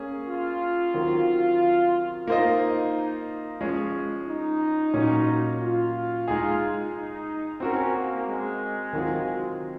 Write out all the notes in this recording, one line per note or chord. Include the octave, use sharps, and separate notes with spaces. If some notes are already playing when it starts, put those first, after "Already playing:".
Already playing: A#3 C#4 G#4
F4
D#3 F#3 C4
A#3 D#4 F4 C5 D#5
F3 G#3 C#4
D#4
A#2 F#3 C#4
F4
G#3 D#4 G#4
D#4
C4 C#4 F#4 A#4
A#3
G#3
D#3 F#3 C4 F4